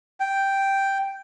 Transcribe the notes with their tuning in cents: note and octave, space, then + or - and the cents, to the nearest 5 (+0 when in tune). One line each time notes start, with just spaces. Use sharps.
G5 +0